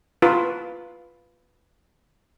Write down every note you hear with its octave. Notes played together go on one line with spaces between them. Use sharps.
F4 B4